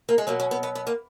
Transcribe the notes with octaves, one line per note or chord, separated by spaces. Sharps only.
A#3
G#3
B2 F#3 A#3
C#4
B3
B3
B3
A#3